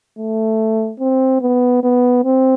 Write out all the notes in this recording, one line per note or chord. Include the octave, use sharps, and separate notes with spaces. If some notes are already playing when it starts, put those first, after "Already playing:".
A3
C4
B3
B3
C4